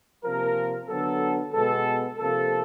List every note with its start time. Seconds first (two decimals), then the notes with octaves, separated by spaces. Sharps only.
0.25 C3 F3 A#3 A#4
0.89 D3 F#3 B3 A4
1.54 B2 G#3 B3 A4
2.19 C3 F3 A#3 A4